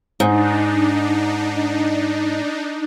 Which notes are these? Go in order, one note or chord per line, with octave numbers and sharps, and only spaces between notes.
G#2 D4 D#4